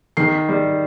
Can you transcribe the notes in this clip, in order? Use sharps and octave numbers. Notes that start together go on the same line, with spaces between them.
D#3 C7
G3